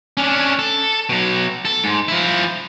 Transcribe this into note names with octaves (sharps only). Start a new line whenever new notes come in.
C#4 D4
A4
B2 F#3
A4
G#2
F3 E4